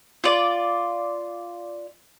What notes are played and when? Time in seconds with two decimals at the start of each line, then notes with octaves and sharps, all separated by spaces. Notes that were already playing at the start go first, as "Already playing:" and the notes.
0.24 F4 D5